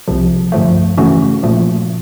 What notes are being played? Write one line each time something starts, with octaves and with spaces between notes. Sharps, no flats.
C2 C3 F3
G2 D3 F3 A3
C#3 E3 A3 C#4 F#4
A#2 F3 A3